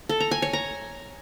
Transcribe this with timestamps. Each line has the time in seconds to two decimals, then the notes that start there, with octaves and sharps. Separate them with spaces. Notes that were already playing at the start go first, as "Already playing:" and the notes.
0.09 A4
0.20 A#5
0.31 G#5
0.42 C#5
0.53 A#5